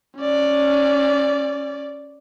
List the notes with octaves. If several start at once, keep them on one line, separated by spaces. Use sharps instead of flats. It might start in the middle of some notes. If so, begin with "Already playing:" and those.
C#4 D5